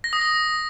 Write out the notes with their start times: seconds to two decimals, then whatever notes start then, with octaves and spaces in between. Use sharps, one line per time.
0.04 A#6
0.13 D#6
0.21 A#6